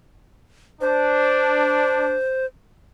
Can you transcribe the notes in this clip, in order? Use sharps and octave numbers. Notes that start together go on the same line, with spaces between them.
D4 C5